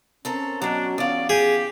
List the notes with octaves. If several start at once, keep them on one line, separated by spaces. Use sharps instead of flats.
C4 C#4 A4 A#4
B2 F#3 D4
E2 F4 D5
G4 G#4